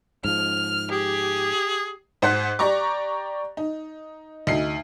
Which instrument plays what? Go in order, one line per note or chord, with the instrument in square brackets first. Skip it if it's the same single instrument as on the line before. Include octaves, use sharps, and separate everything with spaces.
[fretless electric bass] G#2 F3 [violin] F6
[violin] G4 [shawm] G#4
[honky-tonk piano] G#2 C5 F#5 F#6 B6
G4 D5 A#5 C#6 D6
D#4
D2 D#4 C7